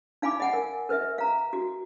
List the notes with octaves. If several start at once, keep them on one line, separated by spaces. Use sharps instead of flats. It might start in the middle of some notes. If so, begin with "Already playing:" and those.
D#4 F5 G#5 B5 D6
D#5 F#5 G#5
A#4
A#4 B4 D#5 E5
F5 A#5
F#4